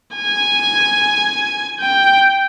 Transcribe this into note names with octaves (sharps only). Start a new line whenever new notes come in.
G#5
G5